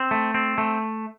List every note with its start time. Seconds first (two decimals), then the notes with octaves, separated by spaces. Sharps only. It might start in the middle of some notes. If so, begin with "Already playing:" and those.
Already playing: C4
0.11 A3
0.34 C4
0.58 A3